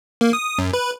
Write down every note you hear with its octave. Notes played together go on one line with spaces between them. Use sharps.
A#3
D#6
F#2
B4